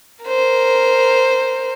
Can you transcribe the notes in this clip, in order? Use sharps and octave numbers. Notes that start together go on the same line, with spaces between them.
A#4 C5